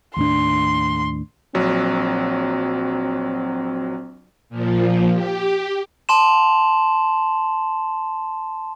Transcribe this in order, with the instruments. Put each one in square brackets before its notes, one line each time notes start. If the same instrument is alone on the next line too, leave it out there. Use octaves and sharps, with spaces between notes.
[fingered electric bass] D#2 A2 D4 [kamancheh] C6
[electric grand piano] A#1 F#3 [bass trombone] C4
[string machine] A#2 F3
G4
[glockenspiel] A5 C6 E7